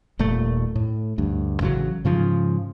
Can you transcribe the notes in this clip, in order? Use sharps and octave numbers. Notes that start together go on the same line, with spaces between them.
D#1 A#2 A3
A2
D2 G2
A1 C#3 F3 F#3
G#2 C#3 F3